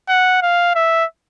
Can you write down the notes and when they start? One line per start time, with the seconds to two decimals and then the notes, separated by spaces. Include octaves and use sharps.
0.09 F#5
0.42 F5
0.75 E5